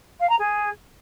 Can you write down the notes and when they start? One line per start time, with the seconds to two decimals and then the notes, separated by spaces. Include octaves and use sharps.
0.20 F5
0.29 A#5
0.39 G#4